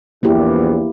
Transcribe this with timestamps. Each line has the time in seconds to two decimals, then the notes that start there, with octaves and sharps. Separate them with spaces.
0.23 A#1 E2 A#3 E4 G4